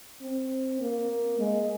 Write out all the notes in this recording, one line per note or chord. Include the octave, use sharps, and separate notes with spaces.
C4
A#3
G#3